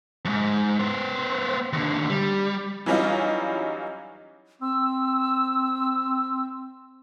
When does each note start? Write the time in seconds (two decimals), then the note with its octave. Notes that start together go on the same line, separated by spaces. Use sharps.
0.25 F2 G#2
0.79 B3 C5
1.73 D#2 D3
2.10 G3
2.86 E3 F#3 G3 C#4 D#4 F4
4.62 C4 E6